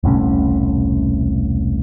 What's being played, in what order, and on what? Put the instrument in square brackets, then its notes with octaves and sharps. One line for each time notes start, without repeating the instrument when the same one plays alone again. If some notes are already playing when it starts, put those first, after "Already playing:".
[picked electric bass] E1 C2 A2 C#4